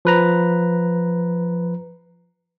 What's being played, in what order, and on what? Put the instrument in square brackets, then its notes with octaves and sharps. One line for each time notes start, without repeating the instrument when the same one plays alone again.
[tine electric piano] F3 B4 A#5